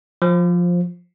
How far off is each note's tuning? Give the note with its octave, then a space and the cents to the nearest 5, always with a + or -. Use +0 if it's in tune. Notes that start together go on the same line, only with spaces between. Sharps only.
F3 +10 C5 +15